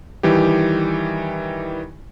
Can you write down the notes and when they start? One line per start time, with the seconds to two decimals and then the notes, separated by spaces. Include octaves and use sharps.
0.23 D#3 E3 G3 G4